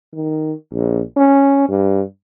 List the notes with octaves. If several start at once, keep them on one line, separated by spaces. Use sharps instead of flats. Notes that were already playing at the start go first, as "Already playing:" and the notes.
D#3
A#1
C#4
G2